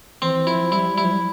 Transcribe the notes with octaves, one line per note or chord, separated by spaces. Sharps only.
E3 C4
E3
F3 E4
F3
G3 E4
G3 E4
F3
G3